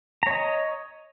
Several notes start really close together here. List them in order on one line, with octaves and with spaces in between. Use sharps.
A#5 C#5 D#5